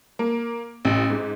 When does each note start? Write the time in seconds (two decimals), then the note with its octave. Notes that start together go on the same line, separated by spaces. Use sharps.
0.19 A#3
0.85 A1
1.10 G#2